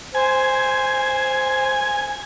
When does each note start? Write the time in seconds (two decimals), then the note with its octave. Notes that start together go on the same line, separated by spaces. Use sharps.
0.15 C5 G#5